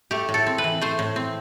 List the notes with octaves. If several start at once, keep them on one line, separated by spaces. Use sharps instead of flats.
A3 G4
A2
A4
C4
B4
E3
A3 C5
A2
C4